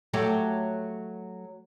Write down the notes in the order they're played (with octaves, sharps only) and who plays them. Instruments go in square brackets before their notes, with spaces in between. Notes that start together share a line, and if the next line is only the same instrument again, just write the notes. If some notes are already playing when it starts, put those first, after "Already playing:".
[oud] F#3 A3 G4